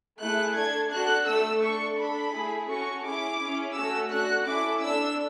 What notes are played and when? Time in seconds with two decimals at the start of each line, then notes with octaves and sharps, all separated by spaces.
0.20 A3 E4 G#4 F#6
0.56 D4 A4 G#6
0.91 D4 F#4 A4 F#6
1.27 A3 D4 A4 E6
1.62 D4 A4 C#6
1.98 D4 A4 B5
2.33 A3 E4 G#4
2.69 C#4 F#4 A4 C#6
3.04 C#4 E4 G#4 D6
3.40 C#4 E4 G#4
3.75 A3 C#4 F#4 A4 E6
4.11 D4 F#4 A4 F#6
4.47 C#4 E4 A4 D6
4.82 D4 A4 E6